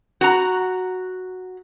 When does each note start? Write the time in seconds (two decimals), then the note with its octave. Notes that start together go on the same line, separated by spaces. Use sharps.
0.21 F#4 A#5